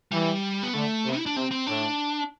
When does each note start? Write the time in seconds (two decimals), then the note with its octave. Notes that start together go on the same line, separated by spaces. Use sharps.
0.11 E3 G3
0.63 B3
0.74 D3 A3
1.05 C3
1.17 E4
1.26 D4
1.35 C3 C4
1.51 C4
1.66 A2 D4